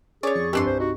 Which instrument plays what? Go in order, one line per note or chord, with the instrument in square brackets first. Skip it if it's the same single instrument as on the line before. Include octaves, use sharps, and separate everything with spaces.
[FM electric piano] C#4 [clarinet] G#4 [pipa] C#5 D5 [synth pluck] C#6
[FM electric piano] F2 [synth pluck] C#6
[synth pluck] G2 C4 G4 [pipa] E3 D4 C6
[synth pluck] C2 [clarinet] C5
[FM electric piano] D#4 [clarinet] F#4